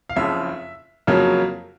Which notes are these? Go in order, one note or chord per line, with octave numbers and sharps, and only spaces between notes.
F5
F#1 F2 C#3 E5
F2 C#3 F#3 A#3